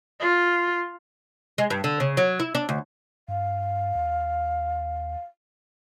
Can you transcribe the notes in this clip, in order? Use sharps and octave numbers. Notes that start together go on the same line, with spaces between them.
F4
G#3
G2
D3
C#3
F#3
E4
D4
D2
G2 F5
D#2